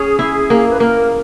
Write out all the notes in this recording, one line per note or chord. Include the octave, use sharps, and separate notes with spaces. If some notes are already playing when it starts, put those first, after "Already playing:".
Already playing: C#4 G#4
E4
A#3
B4
A#3 A#4